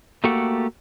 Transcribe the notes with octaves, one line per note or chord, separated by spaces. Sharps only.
A3 A#3 F#4 G4 A4 F#5